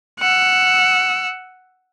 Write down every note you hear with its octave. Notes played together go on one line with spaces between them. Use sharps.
F#5 E6